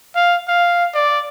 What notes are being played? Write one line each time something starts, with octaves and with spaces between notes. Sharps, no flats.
F5
F5
D5